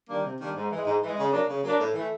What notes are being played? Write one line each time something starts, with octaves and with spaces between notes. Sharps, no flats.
D#3 G3 A#3 D4
C3
D#3 G3 A#3 D4
G#2
E3 G#3
G#2
E3 G#3
C#3
F#3 A#3 D4
C#3
F#3 A#3 D4
A2
E3 A3